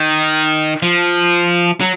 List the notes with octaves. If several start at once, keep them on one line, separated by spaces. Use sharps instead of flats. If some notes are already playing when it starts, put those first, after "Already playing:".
Already playing: D#3
F3
F#3